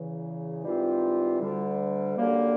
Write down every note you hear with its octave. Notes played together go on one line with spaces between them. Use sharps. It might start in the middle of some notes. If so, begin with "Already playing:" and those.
Already playing: E2 C#3 E3
G#2 E3 G3 C4 F4
D2 D3 G3
F#2 D3 G3 A#3